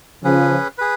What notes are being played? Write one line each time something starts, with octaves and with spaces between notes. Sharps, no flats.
C#3 F3 C#4 G#4 B4
G#4 B4